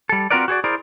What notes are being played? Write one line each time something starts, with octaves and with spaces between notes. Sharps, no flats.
G3 A4
C4 F4 F#4 A#4 B4 D5
F#4 G#4 C#5 D5
E4 G#4 A#4 C5 D5